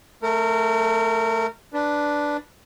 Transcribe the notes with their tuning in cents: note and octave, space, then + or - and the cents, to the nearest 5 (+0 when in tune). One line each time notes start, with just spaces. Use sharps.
A3 +0 A#4 -25
D4 +0 B4 +0